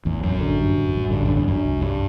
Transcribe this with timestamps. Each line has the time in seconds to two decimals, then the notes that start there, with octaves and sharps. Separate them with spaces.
0.05 A1 E2
0.23 A1 F#2
0.41 D3
0.58 G2
0.76 A1
0.94 A1
1.10 G2 D3
1.23 F#2
1.29 G2
1.36 E2
1.46 F#2 D4
1.65 C2
1.82 G2 G3